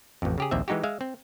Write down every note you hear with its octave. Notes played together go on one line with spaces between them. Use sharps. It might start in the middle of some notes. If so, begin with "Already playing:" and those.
A1 F2
C#3 G4 G#4
A#1 D#2 C4 E5
E3 G#3 D#4 F#4 G4
G#3 E5 F5
C4